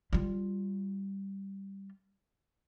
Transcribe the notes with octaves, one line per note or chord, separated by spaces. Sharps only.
G3 F4